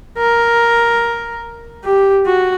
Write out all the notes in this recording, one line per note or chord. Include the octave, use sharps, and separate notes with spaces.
A#4
G4
F#4